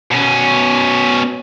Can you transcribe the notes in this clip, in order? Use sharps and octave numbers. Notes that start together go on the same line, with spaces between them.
B2 C#4